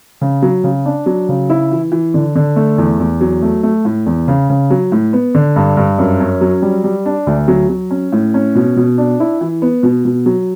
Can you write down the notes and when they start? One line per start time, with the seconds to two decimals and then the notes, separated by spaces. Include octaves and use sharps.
0.21 C#3
0.42 F#3
0.64 C#3
0.86 D4
1.06 F#3
1.29 C#3
1.50 E4
1.71 E3
1.92 E3
2.14 D3
2.35 D3
2.56 A3
2.78 E2
3.00 E2
3.21 F#3
3.42 A3
3.63 A3
3.85 A2
4.06 E2
4.28 C#3
4.50 C#3
4.70 F#3
4.92 A2
5.13 B3
5.35 D3
5.56 G2
5.77 G2
5.99 F#2
6.20 C#4
6.41 F#3
6.62 G3
6.84 G3
7.06 D4
7.27 D2
7.48 F#3
7.70 F#3
7.91 C#4
8.12 A2
8.34 C#4
8.55 B2
8.76 B2
8.98 D4
9.20 E4
9.41 E3
9.62 B3
9.83 B2
10.05 B2
10.26 F#3